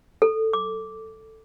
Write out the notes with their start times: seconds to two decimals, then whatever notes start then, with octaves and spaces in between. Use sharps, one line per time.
0.22 A4
0.53 D6